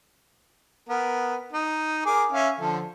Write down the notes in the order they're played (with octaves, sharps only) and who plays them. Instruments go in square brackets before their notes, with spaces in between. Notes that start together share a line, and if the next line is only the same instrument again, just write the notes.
[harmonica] B3 A#4
D#4
G#4 A#4 D6
C#4 E5 F5
D3 F3 A4